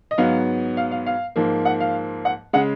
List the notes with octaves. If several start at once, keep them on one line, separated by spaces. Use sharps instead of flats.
D#5
G#2 F#3 B3 F5
F5
F5
F5
G#2 F3 A#3
F#5
F5
F#5
C#3 G#3 F#5